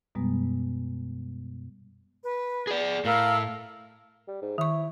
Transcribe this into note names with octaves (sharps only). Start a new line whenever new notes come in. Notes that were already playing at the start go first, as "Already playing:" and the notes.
F#2 B2 G3 G#3 B3
B4
G#4 D5
A2 A#4 F5 E6
G3
G#2
D#3 E4 C#6